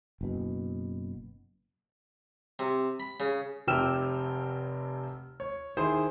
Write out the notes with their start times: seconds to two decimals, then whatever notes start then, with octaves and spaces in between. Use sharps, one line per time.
0.21 F#1 B2
2.59 C3
3.00 B5
3.20 C#3
3.67 F1 C3 G5 E6 F6 E7
5.40 C#5
5.77 D#3 E4 G#4 C5